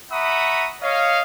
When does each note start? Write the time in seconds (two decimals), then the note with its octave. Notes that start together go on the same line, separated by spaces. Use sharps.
0.12 E5 F#5 A#5 B5 C#6 D#6
0.82 C#5 D#5 F5